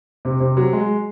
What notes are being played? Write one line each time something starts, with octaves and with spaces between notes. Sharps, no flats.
C3
C3
F#3
G#3